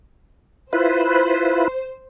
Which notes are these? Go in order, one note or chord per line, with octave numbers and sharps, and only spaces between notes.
E4 F4 B4 C5